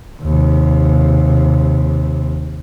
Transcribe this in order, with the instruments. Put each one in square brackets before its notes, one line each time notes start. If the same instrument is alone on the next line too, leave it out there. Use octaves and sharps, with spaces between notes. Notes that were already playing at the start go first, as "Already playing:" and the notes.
[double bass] D#2 C3